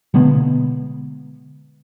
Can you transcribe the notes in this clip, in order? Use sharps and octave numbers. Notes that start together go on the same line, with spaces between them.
B2 D3 G#3 B3